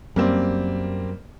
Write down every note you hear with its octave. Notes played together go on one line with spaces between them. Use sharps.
F#2 G3 A#3 C4